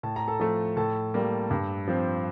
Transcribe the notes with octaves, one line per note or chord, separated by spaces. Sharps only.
A2 A5
A#5
A4 A5
F3 A3
A2 A4 A5
G3 A#3
G2
F3 C4